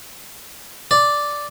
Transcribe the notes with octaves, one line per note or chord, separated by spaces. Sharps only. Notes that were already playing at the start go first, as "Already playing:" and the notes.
D5